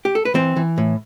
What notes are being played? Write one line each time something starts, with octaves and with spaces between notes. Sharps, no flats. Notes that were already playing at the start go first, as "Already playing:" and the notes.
G4
A4
B4
E3 C4 C5
E3
A2